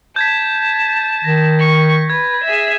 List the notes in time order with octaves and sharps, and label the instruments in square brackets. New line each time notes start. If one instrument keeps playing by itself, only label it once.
[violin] A5 [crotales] G6 G#6 B6
[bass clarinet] D#3 [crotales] A#6
[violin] C#6
[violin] B4 [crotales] G#6
[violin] G#4 E5